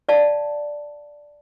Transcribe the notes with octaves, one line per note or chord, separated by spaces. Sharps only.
D5 F5 A5